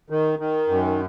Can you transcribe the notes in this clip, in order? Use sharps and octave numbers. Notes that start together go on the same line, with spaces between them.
D#3
D#3
F#2